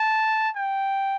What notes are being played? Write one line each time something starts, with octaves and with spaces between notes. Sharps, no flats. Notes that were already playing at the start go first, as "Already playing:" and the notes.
Already playing: A5
G5